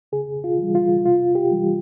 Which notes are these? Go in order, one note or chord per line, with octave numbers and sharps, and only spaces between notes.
C#3 G#4
F4
E3 G3
F4
C3 F4
G4
E3 G3